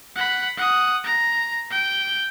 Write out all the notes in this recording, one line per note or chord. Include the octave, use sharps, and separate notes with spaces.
F#5 B5
F#5 D#6
A#5
G5